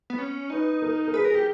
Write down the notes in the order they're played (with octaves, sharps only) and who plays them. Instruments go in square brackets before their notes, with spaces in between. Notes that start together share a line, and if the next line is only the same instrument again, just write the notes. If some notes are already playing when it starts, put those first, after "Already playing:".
[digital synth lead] B3
C#4
[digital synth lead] D#4 [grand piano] B4
[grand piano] A#4
A#4
[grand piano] G#4 [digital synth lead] B4
[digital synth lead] A#4
[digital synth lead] G4 [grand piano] G#4